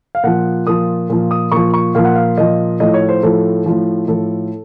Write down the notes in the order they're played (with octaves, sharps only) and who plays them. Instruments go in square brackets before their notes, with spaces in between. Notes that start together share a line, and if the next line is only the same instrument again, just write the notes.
[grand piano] F5
A#2 F3 F#5
A#2 F3 D#6
A#2 F3
D#6
A#2 F3 C#6
C#6
A#2 F3 F5
F#5
F5
A#2 F3 D#5
A2 F3 D#5
C#5
C5
A2 F3 A4
A2 F3
A2 F3 A4